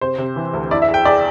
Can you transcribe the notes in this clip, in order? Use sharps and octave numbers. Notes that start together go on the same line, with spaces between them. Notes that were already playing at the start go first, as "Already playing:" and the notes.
C3 C5
C3
E3
D2
E4 D5
E5
E2
G5
E2 D5